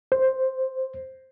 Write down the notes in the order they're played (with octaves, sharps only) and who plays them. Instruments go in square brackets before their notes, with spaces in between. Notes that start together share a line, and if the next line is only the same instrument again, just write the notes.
[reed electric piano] C5